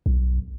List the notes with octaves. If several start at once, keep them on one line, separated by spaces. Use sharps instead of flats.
B1